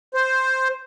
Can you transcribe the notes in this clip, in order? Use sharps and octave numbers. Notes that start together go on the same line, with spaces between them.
C5